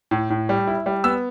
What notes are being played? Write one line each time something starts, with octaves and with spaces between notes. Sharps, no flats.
A2
A2
G3
E4
G3
B3 E6